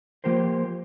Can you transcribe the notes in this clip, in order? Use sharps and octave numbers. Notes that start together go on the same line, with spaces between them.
F3 A#3 G4 A#4 C5